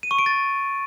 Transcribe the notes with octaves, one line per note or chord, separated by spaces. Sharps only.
D#7
C#6
D7
A6